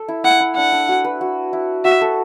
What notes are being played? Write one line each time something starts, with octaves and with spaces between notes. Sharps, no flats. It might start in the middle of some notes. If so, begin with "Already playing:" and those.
Already playing: A4
E4
E4 F#5
E4
D4 F#5
D4
F#4
B4
F#4
E4
F#4 E5
A4